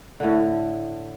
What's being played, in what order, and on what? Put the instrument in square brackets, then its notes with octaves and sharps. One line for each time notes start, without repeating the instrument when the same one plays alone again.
[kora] A2 D3